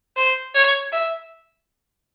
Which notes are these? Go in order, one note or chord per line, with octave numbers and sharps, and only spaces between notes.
C5
C#5
E5